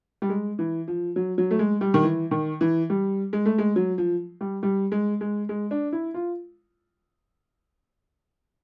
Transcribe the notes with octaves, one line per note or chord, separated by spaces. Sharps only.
G3
G#3
E3
F3
F#3
F#3
A3
G#3
G3
D#3
E3
D#3
E3
G3
G#3
A3
G#3
F#3
F3
G3
G3
G#3
G#3
G#3
D4
E4
F4